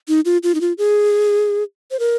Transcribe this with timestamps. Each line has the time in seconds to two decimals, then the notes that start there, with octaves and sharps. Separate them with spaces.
0.08 D#4
0.25 F4
0.43 F4
0.55 D#4
0.61 F4
0.78 G#4
1.91 C5
2.00 A#4